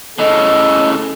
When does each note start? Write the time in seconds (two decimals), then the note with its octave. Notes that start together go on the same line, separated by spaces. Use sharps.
0.19 A2 C#3 A4 D#5